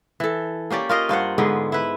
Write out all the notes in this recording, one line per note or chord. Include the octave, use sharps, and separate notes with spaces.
E3 A4
A#3 C#4 G4 D5
F4 A#4 D#5 F5
G2 F4 C5 F#5
G#2 D3 G#3 B3
E4 B4